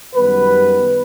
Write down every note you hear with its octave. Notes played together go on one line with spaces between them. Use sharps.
F#2 D#3 G3 B3 B4